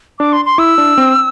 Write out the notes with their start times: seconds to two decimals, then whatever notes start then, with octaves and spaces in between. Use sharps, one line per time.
0.19 D4 D6
0.33 C6
0.45 C6
0.58 E4 E6
0.78 D4
0.98 C4